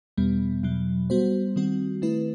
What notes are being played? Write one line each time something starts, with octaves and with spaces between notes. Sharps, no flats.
E2 B2 G3 B3
E2 B2 F#3
G3 B3 F#4 C5
D#3 G3 C4 F#4
D#3 A3 C4 E4 B4